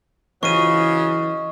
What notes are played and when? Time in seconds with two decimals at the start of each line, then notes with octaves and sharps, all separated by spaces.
0.43 C#3 E3 F#3 D#5 C#6 D#7